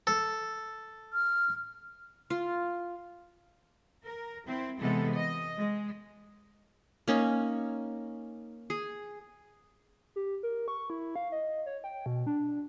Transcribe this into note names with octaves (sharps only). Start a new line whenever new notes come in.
A4
F6
F4
A#4
C4 E4
C3 E3 G#3 B3 A4
D#5
G#3
A#3 C#4 D#4
G#4
G4
A#4
C#6
E4
F5
D#5
C#5
G5
B2
D4